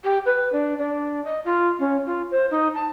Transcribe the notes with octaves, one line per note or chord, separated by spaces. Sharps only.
G4
B4
D4
D4
D#5
F4
C#4
F4
C5
D#4
A5